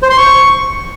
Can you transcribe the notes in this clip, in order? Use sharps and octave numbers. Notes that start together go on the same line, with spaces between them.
C5
C6
C#6